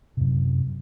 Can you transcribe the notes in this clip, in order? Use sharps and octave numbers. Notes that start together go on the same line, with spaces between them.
F#2 C3